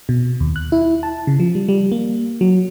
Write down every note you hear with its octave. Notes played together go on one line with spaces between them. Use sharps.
B2
D#2
F#6
E4
A5
C#3
F3
G3
G3
A#3
F#3